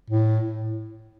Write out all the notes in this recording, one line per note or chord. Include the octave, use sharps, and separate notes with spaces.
A2